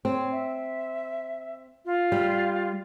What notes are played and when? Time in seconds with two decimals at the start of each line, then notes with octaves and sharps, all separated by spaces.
0.05 C4 C#5
0.31 E5
1.85 F4
2.12 G3